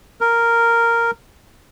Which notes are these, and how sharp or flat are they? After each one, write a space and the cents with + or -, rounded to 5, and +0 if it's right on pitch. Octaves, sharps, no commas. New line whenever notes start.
A#4 -5